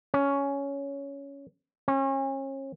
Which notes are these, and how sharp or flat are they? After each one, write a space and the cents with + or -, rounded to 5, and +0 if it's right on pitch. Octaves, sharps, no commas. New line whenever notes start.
C#4 +10
C#4 -35